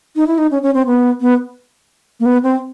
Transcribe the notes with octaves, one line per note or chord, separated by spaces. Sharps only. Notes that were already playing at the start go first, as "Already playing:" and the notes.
D#4
E4
D#4
C#4
C#4
C4
B3
B3
A#3
B3
C4